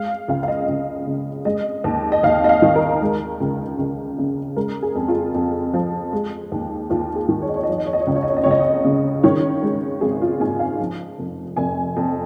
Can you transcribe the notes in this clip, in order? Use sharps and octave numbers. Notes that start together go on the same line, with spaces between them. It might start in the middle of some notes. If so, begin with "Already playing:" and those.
Already playing: G#3 F5
C#2 F5
F5
D#5
C#2
C#3
G#3 D#5
D#2
D#5
D#2 F5
D#5
F5
D#3
A#4
G#3
C#2
C#2
C#3
G#3 A#4
G#4
F2
F4
F2
F3
G#3
D#2
D#2 F4
G#4
D#3
C#5
D#5
C#5
D#5
F3 C#5
D#5
C#5
D#5
C#5
C#2 D#5
C#5
D#5
C#5
D#5
C#2 C#5
D#5
C#5
C#3
D#3 C#5
G#3
G#1 G#4
F4
G#2 G#5
F5
F3
F1
F1 G#5
F2